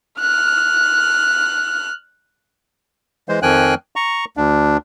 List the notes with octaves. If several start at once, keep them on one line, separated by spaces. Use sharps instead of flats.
F6 F#6
E3 G#3 C5
F2 D#3 F3 G5 G#5 F#6
A#5 C#6
D2 D4